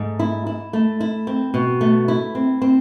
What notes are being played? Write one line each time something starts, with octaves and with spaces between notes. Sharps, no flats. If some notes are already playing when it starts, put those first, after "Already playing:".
Already playing: G#2 A3
E4
E4
A3
E4
C4
B2
A3
E4
C4
C4